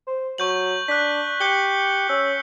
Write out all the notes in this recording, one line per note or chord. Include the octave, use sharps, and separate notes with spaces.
C5
F#3 C#6 G6 F#7
D4 F#6 B6
G4 G6 C#7 G7
C#4 E6